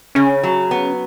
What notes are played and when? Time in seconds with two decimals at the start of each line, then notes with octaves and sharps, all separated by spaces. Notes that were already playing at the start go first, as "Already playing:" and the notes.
0.15 C#3 C#4
0.43 F#3
0.71 B3